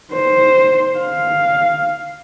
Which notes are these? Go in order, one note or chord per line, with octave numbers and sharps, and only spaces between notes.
C5
F5